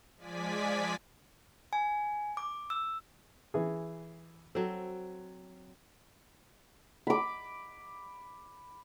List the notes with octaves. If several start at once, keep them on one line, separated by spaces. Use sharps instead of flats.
F3 G#3 D5 G#5 B6
G#5
D6
E6
E3 G#4
F#3 C4 A4
B5 D6